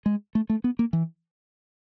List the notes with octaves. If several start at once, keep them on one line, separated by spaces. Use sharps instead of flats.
G#3
A3
A3
B3
A#3
E3